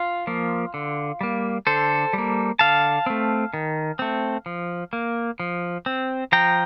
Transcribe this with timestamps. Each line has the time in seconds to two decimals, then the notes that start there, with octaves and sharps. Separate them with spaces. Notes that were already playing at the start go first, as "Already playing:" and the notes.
Already playing: F4
0.27 F3 A#3
0.74 D3
1.21 G3 A#3
1.67 D3 A4 C5
2.13 G3 A#3
2.59 D3 F5 A5
3.06 A3 C4
3.54 D#3
3.99 A3 C4
4.46 F3
4.93 A#3
5.40 F3
5.86 C4
6.32 F3 G5 A#5